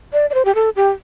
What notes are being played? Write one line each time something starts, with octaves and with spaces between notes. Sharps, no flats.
D5
D5
C5
G4
A4
G4